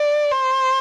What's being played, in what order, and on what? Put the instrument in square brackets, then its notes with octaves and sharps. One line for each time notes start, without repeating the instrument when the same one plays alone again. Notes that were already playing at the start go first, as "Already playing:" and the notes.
Already playing: [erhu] D5
C5